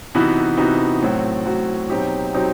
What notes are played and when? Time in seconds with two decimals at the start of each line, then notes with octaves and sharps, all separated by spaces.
0.15 C3 E3 B3 D#4 F#4
0.57 C3 E3 B3 D#4 F#4
1.02 A2 F#3 C4 F#4
1.45 A2 F#3 C4 F#4
1.90 B2 F#3 C4 D#4 G4
2.33 B2 F#3 C4 D#4 G4